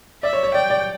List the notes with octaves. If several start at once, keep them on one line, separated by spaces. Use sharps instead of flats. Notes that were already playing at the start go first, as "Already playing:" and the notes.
D5 E5
C#5
C#5
D5 G5
D5